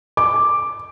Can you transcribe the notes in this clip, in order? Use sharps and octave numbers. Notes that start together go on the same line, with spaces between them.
D6